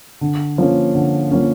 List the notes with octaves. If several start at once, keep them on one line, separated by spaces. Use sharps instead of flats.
D3
F3 A#3 C#4
D3
F3 A#3 C#4